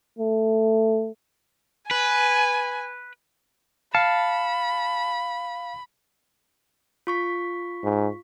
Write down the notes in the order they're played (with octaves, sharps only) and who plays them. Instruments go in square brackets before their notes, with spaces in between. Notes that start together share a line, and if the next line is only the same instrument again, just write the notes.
[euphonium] A3
[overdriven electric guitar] B4 [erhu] G#5
[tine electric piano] F5 C#7 [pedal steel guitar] A5 [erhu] B5
[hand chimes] F4 C#6 B6
[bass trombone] G#2